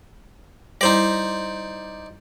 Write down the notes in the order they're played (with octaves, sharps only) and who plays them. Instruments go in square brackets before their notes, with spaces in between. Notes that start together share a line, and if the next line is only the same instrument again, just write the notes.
[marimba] G3 E4 [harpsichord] D#4 C5 D5